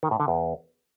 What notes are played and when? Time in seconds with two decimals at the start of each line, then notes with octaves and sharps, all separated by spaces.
0.03 D#3
0.11 A2
0.20 D3
0.28 E2